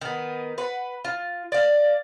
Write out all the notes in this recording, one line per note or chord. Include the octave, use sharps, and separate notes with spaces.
D#3 B3
B4 F#5
F4
D5 F5